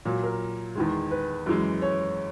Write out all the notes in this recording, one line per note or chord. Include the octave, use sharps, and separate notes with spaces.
A#2 F#3
A#4
E2 D#3 G#3
B4
F#2 E3 G#3
C#5